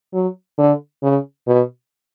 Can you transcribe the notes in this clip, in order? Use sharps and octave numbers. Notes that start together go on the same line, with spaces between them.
F#3
D3
C#3
B2